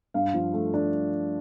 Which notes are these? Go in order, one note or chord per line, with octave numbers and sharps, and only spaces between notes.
G2 F5
F3
A3
D4